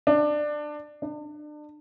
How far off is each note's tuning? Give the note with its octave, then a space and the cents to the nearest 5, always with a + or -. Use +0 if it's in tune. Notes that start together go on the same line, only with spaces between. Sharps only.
D4 +20
D4 +35